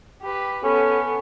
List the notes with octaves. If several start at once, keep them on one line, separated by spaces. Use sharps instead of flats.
G4 B4
B3 C#4 A4